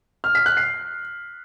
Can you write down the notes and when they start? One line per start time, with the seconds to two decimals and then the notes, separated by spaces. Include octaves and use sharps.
0.24 F6
0.35 B6
0.46 F#6
0.57 C7